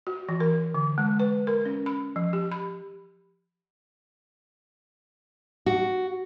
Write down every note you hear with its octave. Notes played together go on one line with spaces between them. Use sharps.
F#4
E3
A#4
D3
G#3
B4
A#4
C#4
B5
F3
G4
B5
F#4